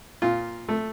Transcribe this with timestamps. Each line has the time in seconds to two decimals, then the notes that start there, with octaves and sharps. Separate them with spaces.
0.22 A#2 F4
0.69 A3